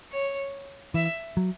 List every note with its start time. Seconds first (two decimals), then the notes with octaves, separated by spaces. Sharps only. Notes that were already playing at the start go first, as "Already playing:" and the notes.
0.12 C#5
0.94 E3 E5
1.37 F#3